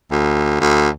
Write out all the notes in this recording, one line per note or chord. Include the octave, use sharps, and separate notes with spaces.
D2
D2